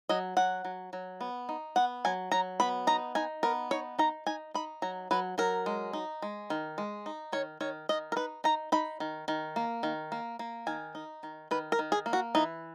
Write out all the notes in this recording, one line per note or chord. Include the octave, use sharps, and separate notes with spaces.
F#3 D#5
F#3 F#5
F#3
F#3
B3
D#4
B3 F#5
F#3 G#5
F#3 A#5
B3 B5
D#4 A#5
D#4 G#5
B3 A#4
D#4 C#5
D#4 A#5
D#4 G#5
D#4 B5
F#3 A#5
F#3 B4
F#3 A#4
G#3
D#4
G#3
D#3
G#3
D#4
D#3 C#5
D#3 C#5
D#3 D#5
A#4
D#4 B4
D#4 A#5
D#4 B5
D#3
D#3
A#3
D#3
A#3
A#3
D#3 G#5
D#4
D#3
D#3 B4
A#4
D#3
G#4
A#3
F#4
E3 D#4